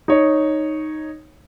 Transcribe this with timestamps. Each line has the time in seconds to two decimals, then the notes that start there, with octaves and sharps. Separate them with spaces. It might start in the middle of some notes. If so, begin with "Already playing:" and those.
0.08 D#4 C#5